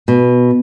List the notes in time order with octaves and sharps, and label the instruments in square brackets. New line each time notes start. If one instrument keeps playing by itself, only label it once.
[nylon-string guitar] B2